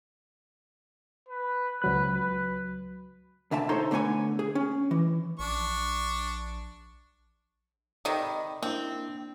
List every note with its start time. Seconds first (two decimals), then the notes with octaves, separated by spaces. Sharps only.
1.29 B4
1.82 C#2 F#3 B4 F#6
2.12 B4
3.51 D2 D3 E5 A5
3.69 D#4 A4 C5 C#5 A#5 C6
3.91 D3 A3 B3 C#5 G#5
4.39 G#4
4.55 C#4
4.91 E3
5.39 A#1 D4 C#6
8.05 C3 D#3 A4 D5
8.20 D5 D#5 B5
8.63 A#3 C4 D4 E4